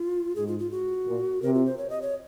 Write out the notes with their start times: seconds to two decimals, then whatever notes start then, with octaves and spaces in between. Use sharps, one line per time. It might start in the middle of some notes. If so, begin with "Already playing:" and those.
Already playing: F4
0.35 G#2 G#4
0.47 F4
0.59 F4
0.71 F#4
1.07 A#2
1.42 C3 A#4
1.54 F4
1.66 C5
1.78 C#5
1.90 D#5
2.02 C#5